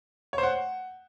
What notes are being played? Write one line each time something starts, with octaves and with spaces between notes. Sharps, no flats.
C#5
C5
F#5